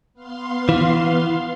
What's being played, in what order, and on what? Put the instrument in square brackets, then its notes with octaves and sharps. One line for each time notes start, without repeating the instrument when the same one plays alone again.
[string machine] B3 F5 C6
[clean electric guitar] E3